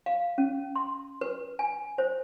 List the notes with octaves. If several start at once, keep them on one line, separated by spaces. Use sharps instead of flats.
F5
C#4
C6
B4
G#5
C5